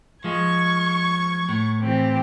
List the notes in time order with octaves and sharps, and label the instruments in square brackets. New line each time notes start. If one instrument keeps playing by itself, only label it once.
[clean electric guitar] F3 G#3 [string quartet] C#6 G#6
[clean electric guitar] A2
[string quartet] E3 C4 G4